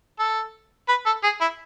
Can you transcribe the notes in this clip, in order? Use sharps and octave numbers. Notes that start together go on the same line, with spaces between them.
A4
B4
A4
G#4
E4